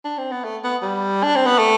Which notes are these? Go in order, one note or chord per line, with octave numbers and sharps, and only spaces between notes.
D4
C4
B3
A3
B3
G3
D4
C4
B3
A3